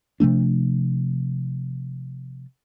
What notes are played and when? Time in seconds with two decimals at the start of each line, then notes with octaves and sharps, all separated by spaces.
0.20 C3 F3 A3 D4